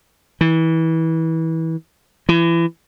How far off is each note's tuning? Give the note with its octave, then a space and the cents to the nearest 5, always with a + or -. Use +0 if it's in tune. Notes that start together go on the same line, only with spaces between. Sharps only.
E3 -25
E3 +30